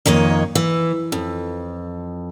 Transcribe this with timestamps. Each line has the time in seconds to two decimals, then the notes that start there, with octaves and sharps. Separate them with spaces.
0.06 F2 D#3 A#3 C#5 D#5
0.55 E3
1.12 F2